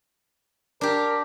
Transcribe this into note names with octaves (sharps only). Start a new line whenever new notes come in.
D4 G4 A#4